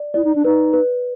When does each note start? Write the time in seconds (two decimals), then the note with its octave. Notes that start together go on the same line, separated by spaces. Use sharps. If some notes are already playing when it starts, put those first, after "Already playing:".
Already playing: D5
0.14 E4 D5
0.24 D#4
0.36 D4
0.44 D#4 B4
0.73 B4